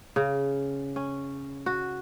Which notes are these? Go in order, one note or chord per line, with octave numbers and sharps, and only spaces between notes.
C#3
C#4
F#4